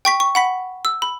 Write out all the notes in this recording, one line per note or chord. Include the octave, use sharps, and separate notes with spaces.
G5 C#6 B6
C#6
F#5 B5 B6
E6
B5